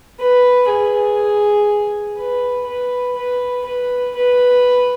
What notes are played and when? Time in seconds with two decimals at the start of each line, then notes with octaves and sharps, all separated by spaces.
0.20 B4
0.70 G#4
2.17 B4
2.67 B4
3.17 B4
3.66 B4
4.16 B4